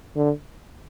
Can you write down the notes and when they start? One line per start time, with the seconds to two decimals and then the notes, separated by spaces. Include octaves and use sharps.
0.16 D3